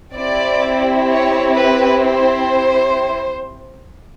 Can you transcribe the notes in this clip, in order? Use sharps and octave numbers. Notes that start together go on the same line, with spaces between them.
C4 E4 G4 D5
C#5
B4
C5